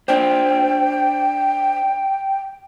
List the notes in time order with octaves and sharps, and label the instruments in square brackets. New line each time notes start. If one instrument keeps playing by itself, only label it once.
[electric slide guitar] D4 C5 [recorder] G5